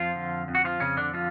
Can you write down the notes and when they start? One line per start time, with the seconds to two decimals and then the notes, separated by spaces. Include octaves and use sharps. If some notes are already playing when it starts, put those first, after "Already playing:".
Already playing: F2 F3 F4
0.15 D3
0.48 F2
0.55 F#4
0.65 F3 F4
0.80 F2 C#3 C#4
0.97 D3 D4
1.13 D3 F3 F4